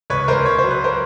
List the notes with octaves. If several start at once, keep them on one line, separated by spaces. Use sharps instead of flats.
C#2 B4 C#5
C#2 A#4 C5
C#2 C#5
F#3 C5
B4
A#4 C5